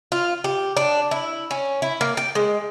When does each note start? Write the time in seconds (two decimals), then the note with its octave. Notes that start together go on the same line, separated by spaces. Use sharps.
0.12 F4
0.44 G4
0.77 D4
1.11 E4
1.51 C#4
1.82 E4
2.01 A#3
2.17 G5
2.35 G#3